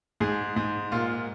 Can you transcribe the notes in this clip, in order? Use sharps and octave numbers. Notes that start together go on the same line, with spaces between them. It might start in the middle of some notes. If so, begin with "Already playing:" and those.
G#2 G#4
G#2
A#2 F4